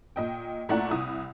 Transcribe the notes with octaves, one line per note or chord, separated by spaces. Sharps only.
A#2 D#5 G5
A#2 A3 E4 D5 F#5 A#5
C2 E4 D#6